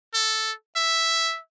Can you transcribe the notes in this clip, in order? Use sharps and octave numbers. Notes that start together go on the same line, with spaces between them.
A4
E5